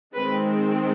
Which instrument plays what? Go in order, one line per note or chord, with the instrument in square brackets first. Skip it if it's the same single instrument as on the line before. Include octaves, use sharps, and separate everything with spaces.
[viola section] D#3 G#3 C4 B4